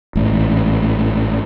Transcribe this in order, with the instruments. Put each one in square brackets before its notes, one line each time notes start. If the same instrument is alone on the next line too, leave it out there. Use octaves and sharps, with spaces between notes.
[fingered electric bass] A1 G#2